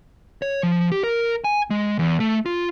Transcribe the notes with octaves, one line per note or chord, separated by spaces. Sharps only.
C#5
F3
G4
A#4
G#5
G#3
E2
A3
F4